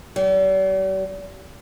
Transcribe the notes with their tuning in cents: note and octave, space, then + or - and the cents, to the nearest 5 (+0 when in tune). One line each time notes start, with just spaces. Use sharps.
G3 -45